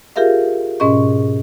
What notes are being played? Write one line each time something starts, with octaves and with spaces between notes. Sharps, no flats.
F4 G4 G#4 A#4 E5 F5
G#2 B2 C#4 G#4 D#5 C#6